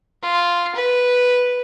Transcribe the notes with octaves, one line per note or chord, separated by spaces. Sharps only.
F4
B4